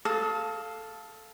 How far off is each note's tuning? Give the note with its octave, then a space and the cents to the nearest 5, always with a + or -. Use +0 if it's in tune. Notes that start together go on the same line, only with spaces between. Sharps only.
A4 +0 F5 +0 D#6 +45